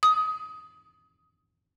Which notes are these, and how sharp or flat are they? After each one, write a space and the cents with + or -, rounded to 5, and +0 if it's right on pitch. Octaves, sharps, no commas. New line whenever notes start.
D#6 +20